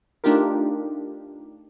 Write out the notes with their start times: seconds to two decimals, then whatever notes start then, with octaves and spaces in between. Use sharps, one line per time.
0.24 A3 D4 D#4 F4 G4 A#4